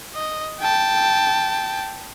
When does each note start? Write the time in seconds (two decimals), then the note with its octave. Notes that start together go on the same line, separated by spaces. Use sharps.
0.15 D#5
0.60 G5 A5